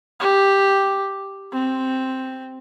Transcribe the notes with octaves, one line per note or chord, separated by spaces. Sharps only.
G4
C4